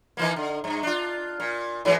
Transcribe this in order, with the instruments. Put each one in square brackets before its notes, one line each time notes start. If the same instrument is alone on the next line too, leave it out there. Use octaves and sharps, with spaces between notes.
[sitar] D#3 E3 A#3
D3
G2
D4 F4
A#2
G#2 E3 F#3